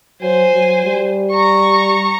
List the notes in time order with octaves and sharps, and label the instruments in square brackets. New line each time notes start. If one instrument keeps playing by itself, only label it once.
[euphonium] F#3 [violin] C5 G#5
[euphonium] F#3
G3
[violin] A#5 C#6